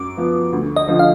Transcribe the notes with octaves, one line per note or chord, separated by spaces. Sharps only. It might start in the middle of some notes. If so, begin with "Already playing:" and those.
Already playing: F#2 D6
F3 B3
D2
D#5
D3 F3
F5